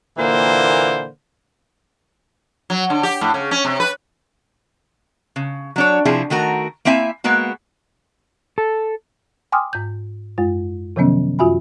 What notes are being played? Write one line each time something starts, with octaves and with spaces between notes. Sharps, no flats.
A#2 D3 E3 A#3 C5
F#3
D3
G4
A2
C#3
C#4
C3
B4
C#3
F#3 D4 C#5
C3 F3 E4 G#4
D#3 A3 F#4 A#4
A#3 C4 E4 E5 G#5
G#3 A#3 B3 F#4
A4
G5 G#5 C6 D6 D#6 F6
G#2 G6
F#2 G#3 F4
C3 D#3 F3 F#3 B3 C#4
F#2 F4 F#4 E5 G#5 B5